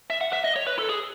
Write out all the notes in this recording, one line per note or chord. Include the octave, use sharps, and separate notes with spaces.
E5
F#5
E5
D#5
C#5
B4
A4
G#4